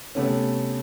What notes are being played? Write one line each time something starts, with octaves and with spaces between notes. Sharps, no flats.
C3 A3 B3 C#4